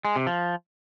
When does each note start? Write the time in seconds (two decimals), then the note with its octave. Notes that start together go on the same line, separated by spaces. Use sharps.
0.05 G#3
0.16 C3
0.27 F3